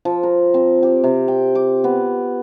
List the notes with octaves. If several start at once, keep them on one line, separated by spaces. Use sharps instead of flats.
F3
A#4
C4
G4
C3
G5
D6
B3